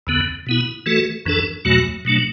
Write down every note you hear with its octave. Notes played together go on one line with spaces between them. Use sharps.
E2 D3 B3
B2 B3 E4
E3 A3 F#4 A4
F#2 E3 D4 A4
E2 B2 F#3 A3 F#4
B2 F#3 A3 D4